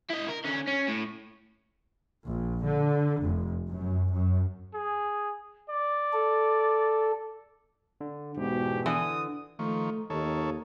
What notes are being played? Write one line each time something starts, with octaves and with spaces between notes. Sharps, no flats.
E4 D#5
A#4
D3 C#4
C#4
A2
A#1
D3
F1
F#2
F#2
G#4
D5
A4
D3
E2 G#2 B2 G4
D3 E3 D#6
D#3 F3 A3 C#6
D#2 D#3 A4 C#5